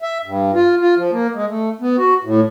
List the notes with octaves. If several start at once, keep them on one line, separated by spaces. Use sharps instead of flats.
E5
G2
F4
F4
F3
A#3
G#3
A3
B3
F#4
A2